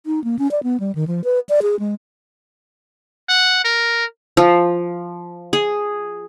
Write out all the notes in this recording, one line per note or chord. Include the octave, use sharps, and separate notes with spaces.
D#4
A#3
C#4
D5
B3
G3
D#3
F3
B4
D5
G#4
G#3
F#5
A#4
F3
G#4